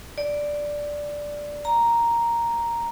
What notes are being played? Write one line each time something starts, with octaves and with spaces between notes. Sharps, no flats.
D5
A#5